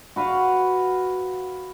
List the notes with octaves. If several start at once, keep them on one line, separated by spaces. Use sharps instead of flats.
F#4 B4 F5 F#5